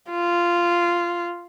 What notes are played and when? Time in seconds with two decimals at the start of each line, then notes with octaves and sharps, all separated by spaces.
0.10 F4